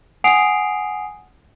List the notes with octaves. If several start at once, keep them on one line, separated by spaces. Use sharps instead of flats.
F#5 G#5 D#6 C7 D7 F7